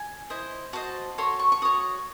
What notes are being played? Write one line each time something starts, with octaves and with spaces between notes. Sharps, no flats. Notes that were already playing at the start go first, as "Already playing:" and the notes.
Already playing: G#5
E4 C5 D#5
F#4 C5 D#5 A5
F#4 A4 C#5 C6
C#6
C#6
F#4 C#5 D#6